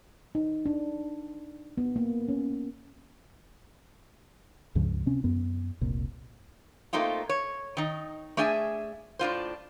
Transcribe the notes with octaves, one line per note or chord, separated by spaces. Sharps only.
D#4
D4
B3
A#3
C#4
C#2 G2 C#3 F3
C3 C4 C#4
F#2 B3
F1 C2 A#2
A3 A#3 C4 D#4 F4
C#5
D#3 D#4
A3 D4 G#4 E5 G5 G#5
A2 D4 F4 C5